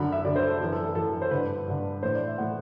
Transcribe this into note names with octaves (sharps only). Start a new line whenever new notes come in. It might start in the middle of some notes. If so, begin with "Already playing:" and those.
Already playing: F#2 D3 B5
E5
F#2 D3 D5
C5
A4
F#2 E3
A4
A4
F#2 E3 A4
C5
G2 D3 B4
G2 D3
A2 E3 C5
D5
E5
A2 E3 F#5